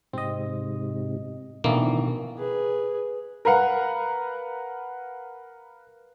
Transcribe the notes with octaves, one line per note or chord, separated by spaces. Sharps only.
G#2 C3 C4 D#5
A1 B2 D3 D#3 F3 A#3 E4
G#4 B4
A#4 B4 F5 F#5